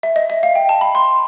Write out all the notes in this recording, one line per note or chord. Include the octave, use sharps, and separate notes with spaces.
E5
D#5
E5
F5
G5
A5
B5
C6